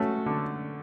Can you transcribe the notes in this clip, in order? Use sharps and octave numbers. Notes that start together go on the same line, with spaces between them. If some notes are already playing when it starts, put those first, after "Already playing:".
Already playing: A3 C#4 F#4 A4
D3